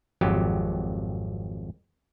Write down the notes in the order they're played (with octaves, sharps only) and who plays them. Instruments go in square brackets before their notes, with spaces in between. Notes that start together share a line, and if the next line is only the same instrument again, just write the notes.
[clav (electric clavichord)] G#1 F2 F#3 G4